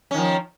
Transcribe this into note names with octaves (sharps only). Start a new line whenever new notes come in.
D#3 F3 C#4